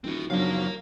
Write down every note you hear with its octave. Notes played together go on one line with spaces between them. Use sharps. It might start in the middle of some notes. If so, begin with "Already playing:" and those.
D#1 E3 C4 F#4
B1 F#2 C#3 F3 F#3 D4 A#4 F5